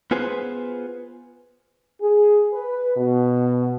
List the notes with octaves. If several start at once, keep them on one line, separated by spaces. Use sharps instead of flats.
B3 F4 G#4 B4 C5
G#4
B4
B2